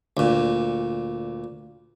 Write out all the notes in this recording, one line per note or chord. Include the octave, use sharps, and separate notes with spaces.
D2 A#2